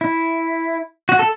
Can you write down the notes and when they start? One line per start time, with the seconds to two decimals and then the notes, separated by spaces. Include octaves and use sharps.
0.01 E4
1.09 F#4
1.19 A4